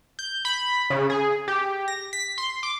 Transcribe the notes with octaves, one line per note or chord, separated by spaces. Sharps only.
G6
B5
C#3
G#4
G4
A#6
B6
C6
D6